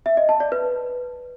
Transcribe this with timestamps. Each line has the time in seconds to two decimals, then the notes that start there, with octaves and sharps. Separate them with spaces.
0.06 E5
0.17 D#5
0.29 A5
0.40 D5
0.52 B4